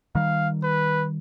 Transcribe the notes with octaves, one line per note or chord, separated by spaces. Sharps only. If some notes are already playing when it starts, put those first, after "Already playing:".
D#3 G3 F5
B4